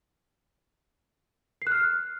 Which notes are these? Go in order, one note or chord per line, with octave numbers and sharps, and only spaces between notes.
C7
F#6
F6